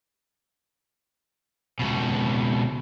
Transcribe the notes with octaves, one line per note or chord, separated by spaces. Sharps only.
C#2 B2